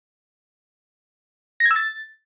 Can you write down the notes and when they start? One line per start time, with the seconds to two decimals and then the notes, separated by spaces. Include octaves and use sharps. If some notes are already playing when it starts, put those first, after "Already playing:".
1.60 A#6
1.66 G#6
1.71 E6
1.76 A6